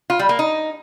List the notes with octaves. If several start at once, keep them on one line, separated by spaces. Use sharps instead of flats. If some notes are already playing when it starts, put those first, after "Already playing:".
F4
G3
A#3
D#4